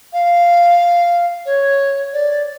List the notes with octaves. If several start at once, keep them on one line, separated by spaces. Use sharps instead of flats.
F5
C#5
D5